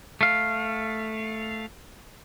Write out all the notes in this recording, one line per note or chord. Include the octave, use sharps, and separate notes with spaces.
A3 F5